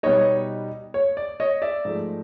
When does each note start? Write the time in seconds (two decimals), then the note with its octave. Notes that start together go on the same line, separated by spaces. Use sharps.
0.03 B2 G3 B3 D#4 C#5 D#5
0.94 C#5
1.17 D5
1.40 C#5 D#5
1.62 D5 E5
1.85 G#2 F3 A3